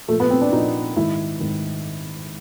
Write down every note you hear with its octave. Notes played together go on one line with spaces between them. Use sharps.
A#2 F3 A3
B3
C4
D4
A#2 F3 D#4
G#2 D#3 E4
G#2 D#3